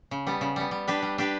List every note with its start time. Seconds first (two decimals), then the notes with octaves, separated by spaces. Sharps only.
0.11 C#3
0.27 G3 B3
0.41 C#3
0.56 G3 B3
0.71 G3
0.88 D4 G4 B4
1.02 G3
1.18 D4 G4 B4